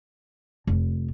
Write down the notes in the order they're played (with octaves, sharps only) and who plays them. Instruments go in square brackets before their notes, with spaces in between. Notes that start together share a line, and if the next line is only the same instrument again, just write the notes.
[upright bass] F1